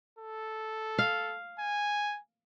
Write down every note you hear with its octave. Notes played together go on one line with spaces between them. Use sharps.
A4
F5
G#5